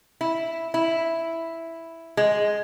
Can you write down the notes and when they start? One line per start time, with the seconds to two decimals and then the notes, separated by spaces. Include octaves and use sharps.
0.21 E4
0.74 E4
2.17 G#3